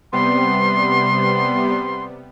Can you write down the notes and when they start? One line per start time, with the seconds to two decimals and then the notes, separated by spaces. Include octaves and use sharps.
0.13 C3 G3 B3 C6